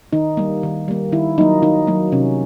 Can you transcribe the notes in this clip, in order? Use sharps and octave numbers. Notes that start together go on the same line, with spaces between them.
D#3 D#4
G3 A#3
D#3
G3 A#3
D#3 E4
F#3 A#3 D#4
D#3 D#4
F#3 A#3
C3 C#4